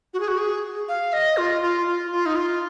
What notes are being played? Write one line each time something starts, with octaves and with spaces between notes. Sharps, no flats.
F#4
G#4
F#4
G#4
F5
D#5
F4
F4
F4
F4
D#4
F4